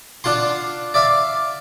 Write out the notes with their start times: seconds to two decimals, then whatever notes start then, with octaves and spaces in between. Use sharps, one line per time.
0.24 D4 F4 F#5 C6
0.94 D5 E5 F5